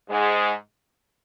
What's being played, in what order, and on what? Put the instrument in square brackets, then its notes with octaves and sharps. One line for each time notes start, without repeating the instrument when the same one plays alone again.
[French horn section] G#2 G#3